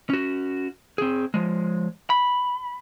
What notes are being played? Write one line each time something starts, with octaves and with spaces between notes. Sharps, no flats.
C#4 F#4
C4 G#4
F3 G#3
B5